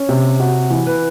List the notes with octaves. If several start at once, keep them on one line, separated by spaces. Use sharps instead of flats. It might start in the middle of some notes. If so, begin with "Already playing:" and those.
Already playing: C#4
C3
C3 F#4
E3
B4